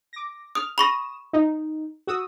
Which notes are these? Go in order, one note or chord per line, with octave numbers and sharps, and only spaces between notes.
D6 A#6
D#6 F6
B5 C#6 D#6 A#6 E7
D#4
F#4 D#6 E6